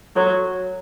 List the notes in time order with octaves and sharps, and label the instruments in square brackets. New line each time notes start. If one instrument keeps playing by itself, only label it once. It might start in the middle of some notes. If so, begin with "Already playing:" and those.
[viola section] F#3 [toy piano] F#4 A4 C#5